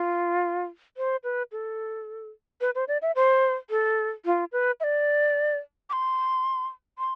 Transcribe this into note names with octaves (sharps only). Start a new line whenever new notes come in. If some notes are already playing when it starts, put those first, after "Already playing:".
Already playing: F4
C5
B4
A4
B4
C5
D5
E5
C5
A4
F4
B4
E5
D5
D6
C6
C6